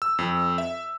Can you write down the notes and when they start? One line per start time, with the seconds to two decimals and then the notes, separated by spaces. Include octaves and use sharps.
0.02 E6
0.19 F2
0.58 E5